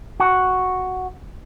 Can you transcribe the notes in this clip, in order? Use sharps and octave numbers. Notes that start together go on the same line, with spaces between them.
F#4